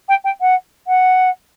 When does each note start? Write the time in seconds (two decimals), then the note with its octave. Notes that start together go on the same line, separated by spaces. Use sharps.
0.09 G5
0.24 G5
0.41 F#5
0.87 F#5